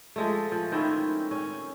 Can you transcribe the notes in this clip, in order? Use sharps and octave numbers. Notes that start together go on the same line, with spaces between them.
F3 G#3 A3
F3
D#3 C4 C#4 E4
C#4